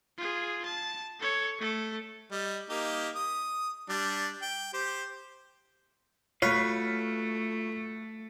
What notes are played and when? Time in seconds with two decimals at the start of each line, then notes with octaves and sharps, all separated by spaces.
0.18 F4 G#4
0.65 A5
1.20 A4 C#5
1.60 A3 A4
2.32 G3 D#5
2.70 A#3 D#4 G4
3.15 D#6
3.89 G3 D4
4.42 G5
4.73 G4 C5
6.42 A3 F4 F#4 B4 C#5 F5